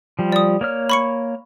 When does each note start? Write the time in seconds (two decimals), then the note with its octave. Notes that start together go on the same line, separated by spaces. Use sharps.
0.19 F3 G3
0.32 D5 D#6
0.61 A#3 C#5 F6
0.90 B5 C#6 C#7